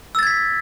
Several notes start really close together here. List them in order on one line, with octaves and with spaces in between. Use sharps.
E6 A6 G#6 B6